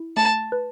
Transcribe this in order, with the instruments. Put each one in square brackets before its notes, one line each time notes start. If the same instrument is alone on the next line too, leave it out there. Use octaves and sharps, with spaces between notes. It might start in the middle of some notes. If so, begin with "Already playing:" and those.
Already playing: [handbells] E4
[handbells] A3 [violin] A5
[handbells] B4